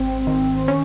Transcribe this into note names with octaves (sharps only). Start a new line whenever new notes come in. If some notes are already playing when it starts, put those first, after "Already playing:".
Already playing: G#1 C4
D#3
C#4